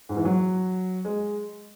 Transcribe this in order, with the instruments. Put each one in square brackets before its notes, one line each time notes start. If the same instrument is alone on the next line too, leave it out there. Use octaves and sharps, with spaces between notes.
[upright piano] G#2
E3
F#3
G#3